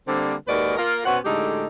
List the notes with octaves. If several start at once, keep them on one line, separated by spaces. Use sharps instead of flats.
D3 G3 A#3 C4
D#2 G#3 F#4 A#4 B4 D5
A#3 F4 A#4
B2 B3 C#4 C5 F#5
A2 D3 G#3 D#4 G4 A4